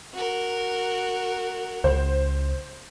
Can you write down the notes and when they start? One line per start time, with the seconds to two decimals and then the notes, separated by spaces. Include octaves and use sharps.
0.14 F#4 A#4
1.84 C#2 C5